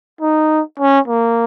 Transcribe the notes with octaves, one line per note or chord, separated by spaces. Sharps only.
D#4
C#4
A#3